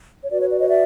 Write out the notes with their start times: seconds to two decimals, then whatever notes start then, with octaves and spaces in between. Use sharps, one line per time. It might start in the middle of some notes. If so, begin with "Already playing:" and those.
0.22 C#5
0.31 F#4 B4 D5
0.40 C#5
0.50 D5
0.59 C#5 D#5
0.68 D5 E5